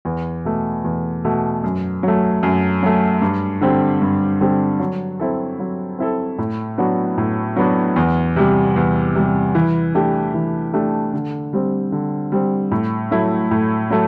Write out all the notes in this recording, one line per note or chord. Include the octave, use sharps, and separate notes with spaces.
E2
B2 A3
E2
B2 A3
F#2
F#3 A3
F#2
F#3 A3
G2
D3 G3 C4 G4
G2
D3 G3 C4 G4
F#3
C4 E4 A4
F#3
C4 E4 A4
A2
F#3 B3 D4 F#4
A2
F#3 B3 D4 F#4
E2
C3 G3
E2
C3 G3
E3
A3 D4 G4
E3
A3 D4 G4
D3
G3 C4
D3
G3 C4
A2
F#3 A3 E4
A2
F#3 A3